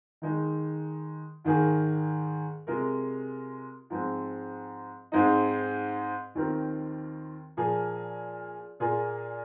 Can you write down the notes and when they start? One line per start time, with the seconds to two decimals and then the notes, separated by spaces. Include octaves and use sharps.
0.22 D#3 G#3 D#4
1.44 G#2 D#3 A#3 G#4
2.67 C3 G#3 F4 A#4
3.90 G#2 F3 G#3 C4
5.12 G#2 G#3 C4 D#4
6.35 D#2 D#3 C4 F4 A#4
7.57 A#2 F3 A#3 G#4
8.80 A#2 A#3 F4 G#4